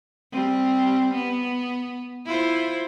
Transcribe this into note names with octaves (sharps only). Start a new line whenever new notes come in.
G3 C4
B3
E4 F4 C5